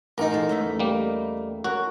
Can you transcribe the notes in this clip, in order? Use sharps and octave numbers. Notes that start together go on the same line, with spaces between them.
A1 D#4 A#4
F2 F3 A4
E2 A3 C#4
G3 A#3
C#4 F#4 A#4